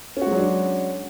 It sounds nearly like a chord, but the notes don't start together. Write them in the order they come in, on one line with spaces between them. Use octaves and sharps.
C#4 F#4 G#3 F#3 D4